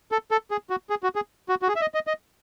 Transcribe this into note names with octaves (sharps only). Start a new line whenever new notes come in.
A4
A4
G#4
F#4
G#4
F#4
G#4
F#4
F#4
G#4
E5
D#5
D#5
D#5